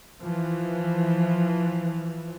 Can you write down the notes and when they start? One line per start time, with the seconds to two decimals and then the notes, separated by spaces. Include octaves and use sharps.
0.22 E3 F3